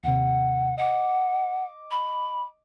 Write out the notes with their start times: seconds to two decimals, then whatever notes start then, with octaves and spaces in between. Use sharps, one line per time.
0.03 D#2 C3 F#5
0.77 D#5 F#5 D6
1.91 B5